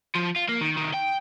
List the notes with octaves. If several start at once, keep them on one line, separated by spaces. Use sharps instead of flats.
F3
F4
A#3
D#3
C2 D#3
G5